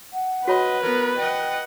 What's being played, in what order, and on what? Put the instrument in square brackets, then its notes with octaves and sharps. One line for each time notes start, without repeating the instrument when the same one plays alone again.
[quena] F#5
[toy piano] F#4 C#5 B5 [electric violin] B4 [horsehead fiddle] D#5
[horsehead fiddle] B3 A#4
[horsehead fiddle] D#5 F#5 [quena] G5